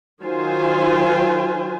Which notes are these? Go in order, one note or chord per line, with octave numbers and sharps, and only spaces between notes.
D#3 F#3 F4 C5 G#5